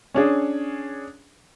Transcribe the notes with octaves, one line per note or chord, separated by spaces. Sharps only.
C#4 D4 G#4